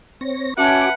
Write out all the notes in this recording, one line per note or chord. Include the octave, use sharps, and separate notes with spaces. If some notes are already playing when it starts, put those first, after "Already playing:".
C4 C#5 A#6
C#4 F#4 B4 E5 F#5 A5 D6